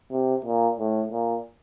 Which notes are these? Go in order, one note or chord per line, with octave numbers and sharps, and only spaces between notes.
C3
A#2
A2
A#2